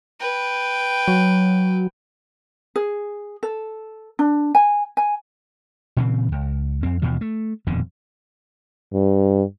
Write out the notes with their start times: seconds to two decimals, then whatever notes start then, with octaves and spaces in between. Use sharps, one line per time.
0.20 B4 G5
1.08 F#3
2.76 G#4
3.43 A4
4.19 D4
4.55 G#5
4.97 G#5
5.97 A#2 C#3 E3 C4
6.32 C#2
6.83 F2 C4
7.02 D#2 B2 E3 F3
7.21 A3
7.67 D#1 F2 B2 D3
8.93 G2